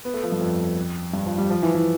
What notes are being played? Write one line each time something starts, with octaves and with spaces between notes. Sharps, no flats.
B3
A3
F3
G2
F2
G2
F3
G3
F3
E3
E3